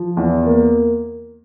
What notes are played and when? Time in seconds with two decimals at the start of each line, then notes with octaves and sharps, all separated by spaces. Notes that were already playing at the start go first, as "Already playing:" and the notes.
Already playing: F3
0.17 E2
0.46 A#3